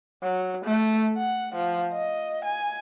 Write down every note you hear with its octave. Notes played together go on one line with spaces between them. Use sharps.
F#3
A3
F#5
F3
D#5
G#5